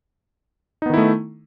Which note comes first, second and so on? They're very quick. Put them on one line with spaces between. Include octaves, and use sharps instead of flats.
D#4 B3 D#3 E4 A3